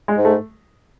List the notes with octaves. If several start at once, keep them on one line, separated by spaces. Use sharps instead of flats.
G#3
G#2
A3